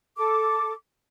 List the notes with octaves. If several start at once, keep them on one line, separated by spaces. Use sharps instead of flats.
A4 D6